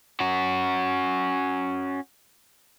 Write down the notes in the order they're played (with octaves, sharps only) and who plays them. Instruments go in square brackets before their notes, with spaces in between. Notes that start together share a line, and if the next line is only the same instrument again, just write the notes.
[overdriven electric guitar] C#4 F#4